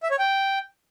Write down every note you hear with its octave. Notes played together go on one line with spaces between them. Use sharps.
E5
C#5
G5